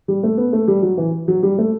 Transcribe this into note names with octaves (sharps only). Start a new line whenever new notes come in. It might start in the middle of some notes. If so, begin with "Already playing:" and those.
G3
A3
B3
A3
G3
F#3
E3
F#3
G3
A3